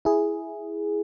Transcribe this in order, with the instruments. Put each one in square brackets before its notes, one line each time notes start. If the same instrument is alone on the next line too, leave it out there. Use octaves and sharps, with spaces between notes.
[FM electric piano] E4 G#4